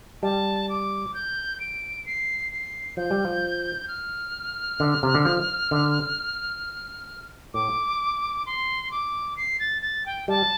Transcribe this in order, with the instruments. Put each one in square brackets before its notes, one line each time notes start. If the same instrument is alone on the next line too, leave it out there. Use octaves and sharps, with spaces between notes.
[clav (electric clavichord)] G3 [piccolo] A5
[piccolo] D6
G6
D7
C7
C7
[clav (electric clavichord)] F3 [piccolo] G6
[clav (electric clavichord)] G3
F3
[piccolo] F6
[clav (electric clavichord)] D3
C3
D3
F3
D3
[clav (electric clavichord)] A2 [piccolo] D6
[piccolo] C6
D6
C7
A6
A6
G5
[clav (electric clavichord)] G3 [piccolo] A5